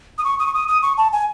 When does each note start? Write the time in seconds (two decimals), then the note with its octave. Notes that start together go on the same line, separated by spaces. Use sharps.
0.18 D#6
0.24 C#6
0.39 D#6
0.46 C#6
0.54 D#6
0.68 D#6
0.83 C#6
0.97 A5
1.13 G#5